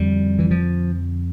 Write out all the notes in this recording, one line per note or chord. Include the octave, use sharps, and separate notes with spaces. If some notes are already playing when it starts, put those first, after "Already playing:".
Already playing: F2 D3 G3
E3
F3